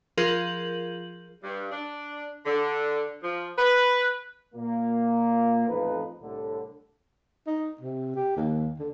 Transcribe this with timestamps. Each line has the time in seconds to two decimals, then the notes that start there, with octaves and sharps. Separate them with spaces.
0.17 F3 F4 G#4 A#4 G6 F#7
1.44 G2
1.71 D4
2.45 D3
3.23 F3
3.58 B4
4.55 A#2 A#3
5.68 A1 F2 G#2 F3 D#4 B4
6.21 C2 A2 D3
7.47 D#4
7.81 C3
8.16 G4
8.37 D#2
8.79 D3